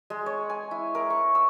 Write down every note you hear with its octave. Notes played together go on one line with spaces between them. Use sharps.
G#3
C#5
G#5
E4
A#4
C#6
E6